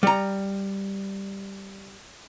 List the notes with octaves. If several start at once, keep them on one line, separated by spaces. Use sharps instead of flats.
G3 A#5